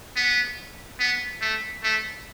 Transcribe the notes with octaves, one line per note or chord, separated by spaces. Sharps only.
B3
B3
A3
A3